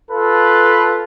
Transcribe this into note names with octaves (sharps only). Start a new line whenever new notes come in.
F4 A4 B4